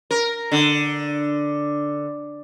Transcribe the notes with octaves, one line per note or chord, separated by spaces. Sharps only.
A#4
D3